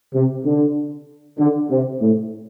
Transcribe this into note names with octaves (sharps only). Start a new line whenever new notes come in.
C3
D3
D3
C3
A2